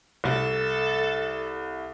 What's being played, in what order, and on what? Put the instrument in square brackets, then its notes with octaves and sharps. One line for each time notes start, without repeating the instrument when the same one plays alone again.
[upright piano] C2 [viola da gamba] A4